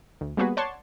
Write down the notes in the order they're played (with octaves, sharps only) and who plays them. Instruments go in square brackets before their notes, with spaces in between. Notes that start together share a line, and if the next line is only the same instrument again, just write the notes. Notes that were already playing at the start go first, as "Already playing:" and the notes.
[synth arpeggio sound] D2
G3 A#3 B3 F#4 G#4 B4
C#5 D5 F#5 A5 C6 C#6